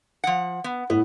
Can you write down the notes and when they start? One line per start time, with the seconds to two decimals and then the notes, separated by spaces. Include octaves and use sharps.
0.24 F3 F#5
0.64 B3
0.90 A2 B3